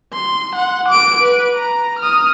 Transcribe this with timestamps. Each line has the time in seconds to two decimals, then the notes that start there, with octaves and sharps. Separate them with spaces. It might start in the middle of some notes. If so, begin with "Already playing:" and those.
0.14 C6
0.56 F#5
0.88 D6 D7
1.20 B4
1.55 A#5
1.99 D#6 F6